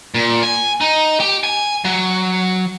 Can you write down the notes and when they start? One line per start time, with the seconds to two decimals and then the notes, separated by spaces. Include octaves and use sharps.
0.15 A#2
0.43 G#5
0.81 D#4
1.20 G4
1.44 G#5
1.85 F#3